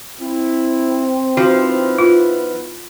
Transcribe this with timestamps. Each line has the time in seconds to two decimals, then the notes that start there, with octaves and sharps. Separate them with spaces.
0.21 C4 E4
1.37 F3 D#4 E4 F#4 B4
1.98 B3 F4